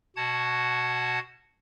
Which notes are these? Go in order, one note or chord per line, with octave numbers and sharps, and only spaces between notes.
B2 F#4 F#5 A5 G#6